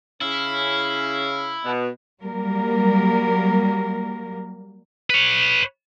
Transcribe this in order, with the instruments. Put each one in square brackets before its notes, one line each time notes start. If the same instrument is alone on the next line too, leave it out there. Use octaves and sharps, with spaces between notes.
[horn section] C#3 C#4 F5 [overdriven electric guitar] E4
[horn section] B2
[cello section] F#3 G3 A#3 A#4
[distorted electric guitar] B4 C#5